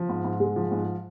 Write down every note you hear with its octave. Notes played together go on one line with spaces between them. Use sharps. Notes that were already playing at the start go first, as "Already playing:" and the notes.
Already playing: F3
G#2
G#2
G#3
F3
G#2